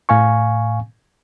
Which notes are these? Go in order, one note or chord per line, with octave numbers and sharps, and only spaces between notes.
A2 F5 G#5 C#6